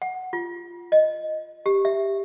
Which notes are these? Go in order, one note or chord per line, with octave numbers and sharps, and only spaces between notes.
F#5
F4
D#5
G4
E5